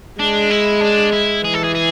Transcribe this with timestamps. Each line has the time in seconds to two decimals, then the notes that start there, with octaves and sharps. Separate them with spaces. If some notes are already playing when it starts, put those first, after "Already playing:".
0.20 G#3 D4
0.51 E4
0.81 D4
1.13 E4
1.44 E3 G#4
1.54 A4
1.64 G#4
1.75 G#4